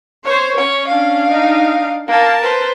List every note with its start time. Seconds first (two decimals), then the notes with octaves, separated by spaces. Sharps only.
0.25 C5 C#5
0.57 C#4 C#5
0.88 D4 F5
1.27 D#4
2.08 A#3 A#4 A5
2.42 B4 C5